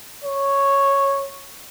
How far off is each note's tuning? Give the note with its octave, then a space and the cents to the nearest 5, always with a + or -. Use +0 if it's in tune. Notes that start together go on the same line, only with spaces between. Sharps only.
C#5 -5